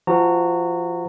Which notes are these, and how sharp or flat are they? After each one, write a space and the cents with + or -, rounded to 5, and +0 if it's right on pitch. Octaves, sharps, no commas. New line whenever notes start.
F3 -20 F#4 +0 A#5 -30